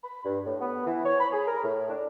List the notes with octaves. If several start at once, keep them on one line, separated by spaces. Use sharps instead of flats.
B5
G2
A2
B3
E3
C#5
B5
G#4
A#4
A2
D4